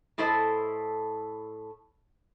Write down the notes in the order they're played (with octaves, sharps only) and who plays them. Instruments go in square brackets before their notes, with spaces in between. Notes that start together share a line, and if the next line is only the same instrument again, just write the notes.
[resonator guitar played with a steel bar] A2 E4 A4 C5 D#5 A5